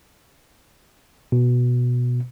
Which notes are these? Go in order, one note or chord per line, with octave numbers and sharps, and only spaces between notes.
B2